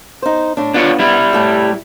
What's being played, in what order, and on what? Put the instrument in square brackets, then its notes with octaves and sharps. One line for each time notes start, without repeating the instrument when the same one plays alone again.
[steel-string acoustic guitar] D#4 C5
A2 D4
[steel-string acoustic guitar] B3 [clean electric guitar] D4 F4 C#5
[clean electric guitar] G3 E4
[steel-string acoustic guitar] A2 A3 G4